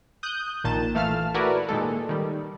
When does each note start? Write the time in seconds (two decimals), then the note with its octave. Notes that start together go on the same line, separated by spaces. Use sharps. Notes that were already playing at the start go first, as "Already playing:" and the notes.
0.23 D#6 F#6 G6
0.64 A#1 A#2 D#3 A5 E7
0.95 E3 A3 F5 A5 F6
1.34 E4 F#4 A#4 B4 D5
1.69 A#2 D#3 G#3 A4
2.09 D#3 G3